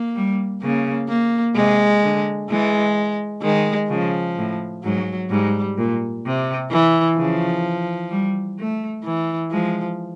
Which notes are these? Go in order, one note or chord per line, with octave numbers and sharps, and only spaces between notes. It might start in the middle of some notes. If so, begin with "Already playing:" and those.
Already playing: A#3
G3
C#3 A#3
A#3
C3 G#3
D3
E3 G#3
D#3 G#3
C#3 F3
A2
G#2 F#3
G#2 G3
A#2
C3
E3
C#3 F3
G3
A3
E3
F3 G#3